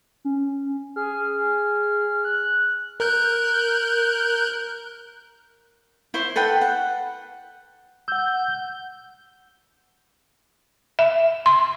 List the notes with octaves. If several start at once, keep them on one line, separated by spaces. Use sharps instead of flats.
C#4
G#4 F6
F#6
A#4 F#6 G6
E4 C5 C#6
A4 B4 F#5 G5
F#5
F#5 E6 G6
E5
C6